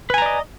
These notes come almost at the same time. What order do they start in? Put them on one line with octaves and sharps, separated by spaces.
B4 G#5 A#5 D5 D#5